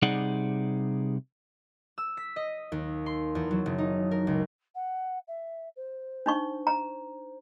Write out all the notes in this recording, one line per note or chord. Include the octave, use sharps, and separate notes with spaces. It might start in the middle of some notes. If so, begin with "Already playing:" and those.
C3 G3 D#4 G#4 D5 F#5
E6
B6
D#5
D#2
C6
E2
F#3
F#1
D#4
A#4
C#2
F#5
E5
C5
D4 D#4 C#6
A#5